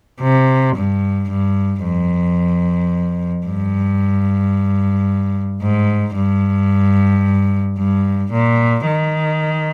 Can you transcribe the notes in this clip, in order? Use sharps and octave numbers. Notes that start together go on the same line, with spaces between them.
C3
G2
G2
F2
G2
G#2
G2
G2
A#2
D#3